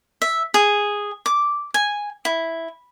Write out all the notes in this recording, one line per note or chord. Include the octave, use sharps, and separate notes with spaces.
E5
G#4
D6
G#5
E4